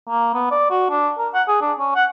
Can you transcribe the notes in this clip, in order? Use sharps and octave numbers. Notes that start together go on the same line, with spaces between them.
A#3
B3
D5
F#4
D4
A#4
F#5
G#4
D4
C#4
F#5